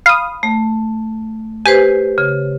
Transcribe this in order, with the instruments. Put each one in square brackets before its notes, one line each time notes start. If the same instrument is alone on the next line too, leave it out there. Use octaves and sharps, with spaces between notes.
[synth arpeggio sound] F5 D#6 [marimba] B5
[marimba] A3
[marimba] G4 B4 C5 [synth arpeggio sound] G#5
[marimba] C#3